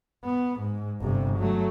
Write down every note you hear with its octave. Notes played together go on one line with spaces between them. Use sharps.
B3
G#2
G1 C3
F#3 A3